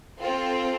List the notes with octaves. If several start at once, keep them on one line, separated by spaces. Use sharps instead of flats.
C4 F4 A4